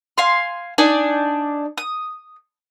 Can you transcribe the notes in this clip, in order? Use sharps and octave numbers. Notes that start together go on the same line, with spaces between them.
F5 G#5 C6
D4 D#4 D5 G#5
D#6